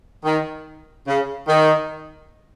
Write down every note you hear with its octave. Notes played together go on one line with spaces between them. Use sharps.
D#3
C#3
D#3